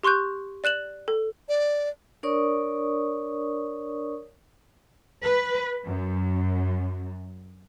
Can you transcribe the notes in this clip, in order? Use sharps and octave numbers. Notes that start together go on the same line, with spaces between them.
G4 C6 C#6 F#6 G6
D5 F#6 E7 F#7
A4
D5
D4 A#4 C#5 D5 C#6 D#6
B4
F#2